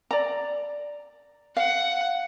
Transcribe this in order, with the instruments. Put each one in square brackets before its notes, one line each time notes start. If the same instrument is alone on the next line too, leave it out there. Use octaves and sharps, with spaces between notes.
[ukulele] D5 A#5
[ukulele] F5 [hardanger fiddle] F#5